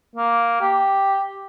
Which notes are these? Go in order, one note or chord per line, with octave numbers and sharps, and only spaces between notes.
A#3
G4